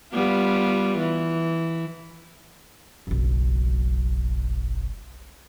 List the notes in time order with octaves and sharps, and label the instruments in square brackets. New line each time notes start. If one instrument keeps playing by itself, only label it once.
[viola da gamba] G3 B3 F4
E3
[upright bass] F#1 B1